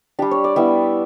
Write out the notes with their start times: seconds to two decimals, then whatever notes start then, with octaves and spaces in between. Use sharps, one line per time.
0.19 G3 D4 G4
0.31 C#5
0.44 D5
0.56 G3 B3 E4 E5